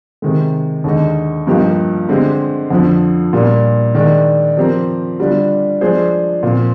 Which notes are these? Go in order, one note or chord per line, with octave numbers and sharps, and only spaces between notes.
C3 D#3 G#3
D#2 D3 G#3 D#4
G2 F3 A#3 D#4 G4
D3 G#3 C4 G4
F2 D3 F3
A#2 G3 A#3 D4
D#3 G#3 D4
F3 C4 G4 A#4
D3 G3 D4 F4
F3 G#3 D4 G#4 C5
A#2 F3 C4